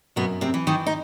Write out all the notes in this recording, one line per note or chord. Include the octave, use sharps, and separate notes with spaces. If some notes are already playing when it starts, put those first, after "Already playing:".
F#2 B2 B3
C3 C4
E3
D#3 D#4
D#4